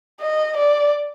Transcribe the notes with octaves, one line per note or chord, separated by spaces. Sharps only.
D#5
D5